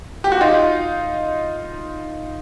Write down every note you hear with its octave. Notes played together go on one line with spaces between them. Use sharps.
G4
F#4
D#4 F4